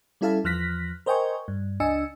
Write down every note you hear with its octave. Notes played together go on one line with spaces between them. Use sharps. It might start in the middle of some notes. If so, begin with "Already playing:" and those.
G3 C#4 E4 A4 F5 A5
E2 F3 F6 F#6 A#6 B6
A#4 C5 D#5 G5 G#5 C#6
G2
C#2 D4 D#5 G#5 E6 C#7